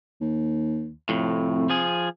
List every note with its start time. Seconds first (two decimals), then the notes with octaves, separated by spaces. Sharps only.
0.21 D#2
1.09 F2 A2 C3
1.70 F3 G#4